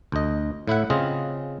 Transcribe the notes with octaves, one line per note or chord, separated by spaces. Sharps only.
D2 D#5
A2 E4 E5 F#5
C#3 C4 F4 G#4 D#5